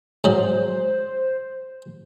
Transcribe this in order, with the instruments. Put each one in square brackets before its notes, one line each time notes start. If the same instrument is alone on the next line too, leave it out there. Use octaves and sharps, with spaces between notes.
[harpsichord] G#2 F#3 [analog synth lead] C5